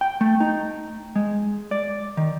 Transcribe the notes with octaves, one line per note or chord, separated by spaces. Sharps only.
G5
A3
D#4
G#3
D5
D#3